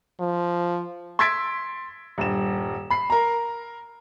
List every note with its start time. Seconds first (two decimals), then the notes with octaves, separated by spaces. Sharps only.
0.20 F3
1.19 C6 E6 G#6 A6 B6 D7
2.18 D#1 G2 E7
2.90 B5 C7
3.10 A#4 A#5